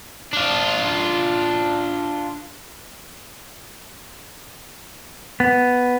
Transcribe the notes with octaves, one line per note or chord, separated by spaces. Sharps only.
D4 F4
B3